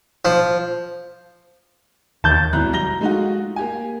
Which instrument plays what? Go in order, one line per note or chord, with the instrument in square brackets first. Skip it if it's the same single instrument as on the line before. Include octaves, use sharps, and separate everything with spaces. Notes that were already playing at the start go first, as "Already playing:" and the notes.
[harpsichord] F3
[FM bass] D#2 [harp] A5 G6
[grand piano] G#1 B2 E4 A#5 F#6
F#3 G3 A#5 A#6 G7
G#3 A3 D#4 F4 F#4
A#3 G4 G#5